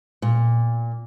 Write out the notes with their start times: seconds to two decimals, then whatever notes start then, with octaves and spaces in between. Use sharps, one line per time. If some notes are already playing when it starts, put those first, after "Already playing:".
0.22 A#2